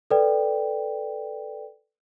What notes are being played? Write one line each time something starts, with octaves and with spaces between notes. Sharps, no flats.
A4 B4 D5 G5